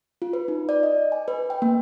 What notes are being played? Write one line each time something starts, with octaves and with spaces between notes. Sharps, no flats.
F4
B4
D#4
D5
D#5
G#5
B4
G5
A#3